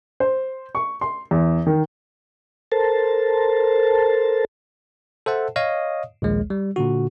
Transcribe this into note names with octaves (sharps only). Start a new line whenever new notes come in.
C5
C#6
C6
E2
D#3
A4 A#4 C5 A5
A4 C5 E5 F#5 A5
C#5 D#5 F5 D#6
A#1 D#2 G#3
G3
A#2 D3 F#4